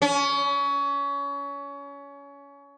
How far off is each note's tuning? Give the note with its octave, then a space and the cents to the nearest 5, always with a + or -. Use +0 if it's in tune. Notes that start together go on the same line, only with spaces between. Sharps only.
C#4 +25